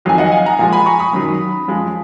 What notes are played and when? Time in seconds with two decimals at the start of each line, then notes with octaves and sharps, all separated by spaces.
0.05 F2 D#3 F#3 G#5
0.18 D#5 F#5
0.32 F5 G#5
0.45 F#5 A#5
0.59 A#2 F3 G#3 F5 G#5
0.73 G#5 B5
0.86 A#5 C#6
0.99 B5 D#6
1.13 F#2 D#3 F#3
1.68 F#2 F3 G#3